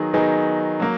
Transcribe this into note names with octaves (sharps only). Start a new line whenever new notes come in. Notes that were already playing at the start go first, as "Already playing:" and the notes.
Already playing: D#3 F#3 B3 D#4 G#4
D#3 F#3 B3 D#4 G#4
F#3 A#3